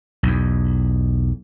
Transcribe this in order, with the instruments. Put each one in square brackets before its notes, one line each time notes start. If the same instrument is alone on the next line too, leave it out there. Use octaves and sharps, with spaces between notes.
[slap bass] B1 E2